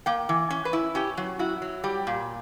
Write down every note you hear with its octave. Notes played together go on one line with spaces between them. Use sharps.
A#3 G5
E3
C#4
B4
E4
C#4 G4
F#3
E4 F#4
F#3
G3 G4
A#2